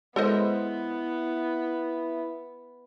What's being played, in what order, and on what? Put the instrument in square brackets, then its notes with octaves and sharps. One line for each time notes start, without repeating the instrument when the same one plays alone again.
[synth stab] G#3 C5 [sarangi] B3 [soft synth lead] E4 [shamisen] A4 A#4 D#5